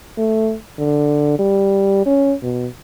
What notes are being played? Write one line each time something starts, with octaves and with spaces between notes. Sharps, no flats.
A3
D3
G3
C#4
B2